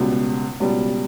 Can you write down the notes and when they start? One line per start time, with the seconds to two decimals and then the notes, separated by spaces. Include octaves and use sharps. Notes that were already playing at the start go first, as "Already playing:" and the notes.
Already playing: C#2 B2 G3
0.60 C#2 B2 G3